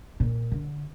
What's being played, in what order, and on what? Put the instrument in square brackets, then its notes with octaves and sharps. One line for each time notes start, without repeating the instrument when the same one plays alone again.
[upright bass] A#2
D3